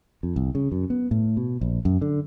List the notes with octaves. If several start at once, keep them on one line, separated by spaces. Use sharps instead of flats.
F2
C2
C#3
F#2
B3
A2
B2
A#1
F#2
D3